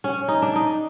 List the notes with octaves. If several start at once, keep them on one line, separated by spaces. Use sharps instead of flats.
C#4
D#4
D4
D#4